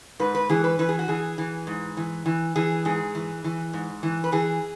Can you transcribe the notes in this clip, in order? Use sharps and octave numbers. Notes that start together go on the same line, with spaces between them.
G#2 B4
B4
E3 G#4
B4
E3 B4
G#4
F#4
E3 G#4
E3
G#2
E3
E3
E3 G#4
G#2 G#4
E3
E3
G#2
E3
B4
E3 G#4